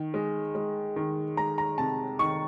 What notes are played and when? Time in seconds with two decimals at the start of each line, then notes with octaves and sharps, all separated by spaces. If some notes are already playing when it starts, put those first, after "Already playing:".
Already playing: D#3
0.14 G#3
0.55 G#3
0.96 D#3
1.37 G#3 A#5
1.58 A#5
1.78 C3 A5
2.19 D#3 C#6